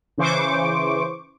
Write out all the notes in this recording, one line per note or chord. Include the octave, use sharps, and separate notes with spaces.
C#3 E3 C5 C#6 D6